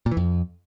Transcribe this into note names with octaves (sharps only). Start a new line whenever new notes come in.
A#2
E3
F2